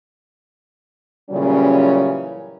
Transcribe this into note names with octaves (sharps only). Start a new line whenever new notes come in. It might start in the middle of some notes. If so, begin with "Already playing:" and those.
A#2 C#3 E3 F#3 G3 C#4